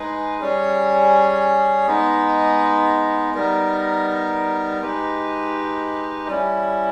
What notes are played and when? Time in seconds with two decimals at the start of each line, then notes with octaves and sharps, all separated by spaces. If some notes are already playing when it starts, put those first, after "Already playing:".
Already playing: G#3 D#4 G#4 B4
0.40 G3 C#4 G#4 C#5
1.87 G#3 B3 D#4
3.34 G3 B3 D#4 A#4
4.81 G#3 D#4 G4 B4
6.27 G3 C#4 E4